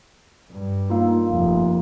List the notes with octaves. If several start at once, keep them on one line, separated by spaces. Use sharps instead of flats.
G2
A#3 D#4 F4
F1